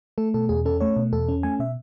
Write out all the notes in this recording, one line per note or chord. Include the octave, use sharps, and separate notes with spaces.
A3 A4
B2 A4
E2 G#4
C#4 A4
A3 C#5
B2
E2 A4
C#4
A3 G#5
B2 E5